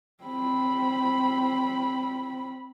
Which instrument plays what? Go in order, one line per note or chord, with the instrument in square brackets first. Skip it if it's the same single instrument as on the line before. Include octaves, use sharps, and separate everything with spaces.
[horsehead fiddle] C4 B5